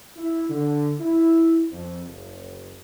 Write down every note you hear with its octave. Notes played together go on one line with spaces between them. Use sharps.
E4
D3
E4
F2
F#1